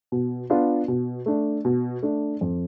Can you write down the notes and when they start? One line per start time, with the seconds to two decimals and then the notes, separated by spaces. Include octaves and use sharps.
0.12 B2
0.50 B3 D4 F4
0.88 B2
1.26 A3 D4
1.65 B2
2.02 A3 D4
2.41 F2